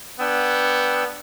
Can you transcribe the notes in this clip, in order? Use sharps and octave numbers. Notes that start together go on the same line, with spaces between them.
B3 D4 G5 E6